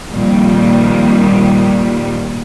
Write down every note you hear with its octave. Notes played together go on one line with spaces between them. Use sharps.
F2 A#2 D#3 G3